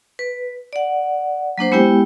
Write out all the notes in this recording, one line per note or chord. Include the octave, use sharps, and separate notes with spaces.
B4
D5 F#5
F#3 A#3 D4 C5
G#3 B3 E4 G4 G5